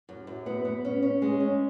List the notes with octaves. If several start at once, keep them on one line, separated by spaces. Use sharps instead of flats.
F#2
F#2
B3
B3
C#4
C#4
G#3
C#4